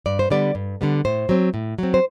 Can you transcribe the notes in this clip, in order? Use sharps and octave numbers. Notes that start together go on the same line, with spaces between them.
G2 D5
C5
D3 G3 B3 D5
G2
D3 G3 B3
A2 C5
F#3 C4
A2
F#3 C4
C5